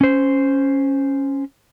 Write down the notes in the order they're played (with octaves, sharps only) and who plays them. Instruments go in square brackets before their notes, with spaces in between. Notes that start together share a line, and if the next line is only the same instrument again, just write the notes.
[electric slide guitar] C#4 C5